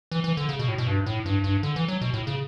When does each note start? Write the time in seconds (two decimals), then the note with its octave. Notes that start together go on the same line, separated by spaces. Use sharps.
0.11 E3
0.24 E3
0.37 D3
0.49 C#3
0.59 B2
0.68 A2
0.78 B2
0.87 G2
1.06 A2
1.26 G2
1.44 G2
1.63 D3
1.76 E3
1.88 F#3
2.01 B2
2.13 A2
2.27 C#3